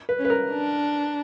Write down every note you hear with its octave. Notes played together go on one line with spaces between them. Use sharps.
B4
C#4
B4
A#4
D4